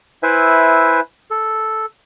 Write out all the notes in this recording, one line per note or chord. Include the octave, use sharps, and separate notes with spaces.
E4 B4 C5 E5 G#5
A4